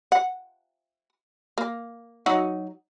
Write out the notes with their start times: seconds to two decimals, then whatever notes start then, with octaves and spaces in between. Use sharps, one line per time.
0.12 F#5
1.58 A#3
2.26 F#3 D#4 F#4